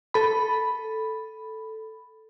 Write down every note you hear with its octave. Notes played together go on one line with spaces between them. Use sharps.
A4 B5